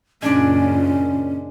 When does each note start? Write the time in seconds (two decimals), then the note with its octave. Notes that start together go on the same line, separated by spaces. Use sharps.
0.22 F#2 A#2 C#3 G#3 C#4 D4 D5